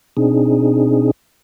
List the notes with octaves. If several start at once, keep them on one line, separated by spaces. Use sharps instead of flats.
B2 C4 D4 D#4 G#4